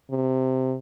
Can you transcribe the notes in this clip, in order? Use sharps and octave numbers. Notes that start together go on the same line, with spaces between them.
C3